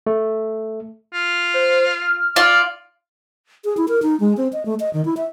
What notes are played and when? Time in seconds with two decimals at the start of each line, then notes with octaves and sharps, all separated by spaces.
0.07 A3
1.14 F4
1.54 C5
2.01 F6
2.36 F4 D5
3.65 G#4
3.77 E4
3.88 A#4
4.02 D#4
4.20 G#3
4.37 C4
4.53 D#5
4.66 A3
4.80 D#5
4.93 D#3
5.05 E4
5.17 E5